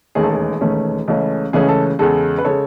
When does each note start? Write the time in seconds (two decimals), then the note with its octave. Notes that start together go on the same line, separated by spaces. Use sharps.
0.15 E1 D#2 D#3 A3 C#4 G#4
0.24 A4
0.32 G#4
0.61 E1 D#2 D#3 A3 C#4
1.08 C#2 C#3 E3 A3 C#4
1.53 C#2 C#3 E3 A3 C#4 G#4
1.68 A4
1.99 E2 C#3 G#3 A4
2.38 B4
2.45 C#3 G#3 A4 C#5